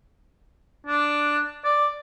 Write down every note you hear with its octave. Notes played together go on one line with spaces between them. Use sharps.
D4
D5